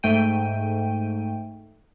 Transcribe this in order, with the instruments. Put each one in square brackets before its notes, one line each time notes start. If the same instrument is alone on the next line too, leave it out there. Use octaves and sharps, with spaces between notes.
[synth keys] G#2 A3 G5 D#7